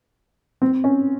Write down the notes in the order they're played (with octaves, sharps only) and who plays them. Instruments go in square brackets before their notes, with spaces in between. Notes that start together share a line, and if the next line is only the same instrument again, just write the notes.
[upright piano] C4
C#4